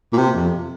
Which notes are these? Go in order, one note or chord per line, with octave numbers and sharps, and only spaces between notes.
A#2
C3
F2